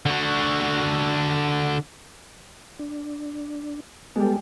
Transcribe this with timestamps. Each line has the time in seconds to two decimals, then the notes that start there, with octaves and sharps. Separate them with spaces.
0.06 D3 F#4
2.79 D4
4.16 G3 G#3 B3 G4 A4